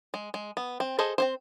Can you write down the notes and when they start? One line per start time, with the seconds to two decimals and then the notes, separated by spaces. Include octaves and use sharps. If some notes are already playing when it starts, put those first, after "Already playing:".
0.14 G#3
0.34 G#3
0.57 B3
0.80 C4
0.99 G#4 A4 C5 D#5
1.18 C4 E4 C5